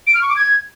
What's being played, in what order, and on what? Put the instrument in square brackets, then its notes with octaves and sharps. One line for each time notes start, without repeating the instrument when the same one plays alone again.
[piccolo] D7
F6
C#6
D6
G#6